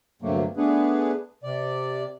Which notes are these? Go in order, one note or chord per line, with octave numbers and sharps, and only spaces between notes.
D2 G2 C3 F#3 A3 A#3
A3 B3 D4 G#4 B4
C3 D5